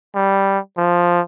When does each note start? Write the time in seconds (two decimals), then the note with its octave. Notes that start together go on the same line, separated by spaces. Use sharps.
0.15 G3
0.77 F3